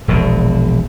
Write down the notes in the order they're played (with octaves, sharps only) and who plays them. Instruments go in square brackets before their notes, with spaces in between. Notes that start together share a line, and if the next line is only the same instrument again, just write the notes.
[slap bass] E1 A#1 B2